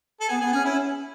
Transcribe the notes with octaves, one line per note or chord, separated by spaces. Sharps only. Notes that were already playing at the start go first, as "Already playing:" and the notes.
A4
B3 G#4
B3 G#4
C#4 G#4
C#4 E4